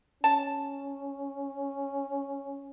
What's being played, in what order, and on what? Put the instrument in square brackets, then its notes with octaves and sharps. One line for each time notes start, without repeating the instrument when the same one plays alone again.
[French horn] C#4 [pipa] A5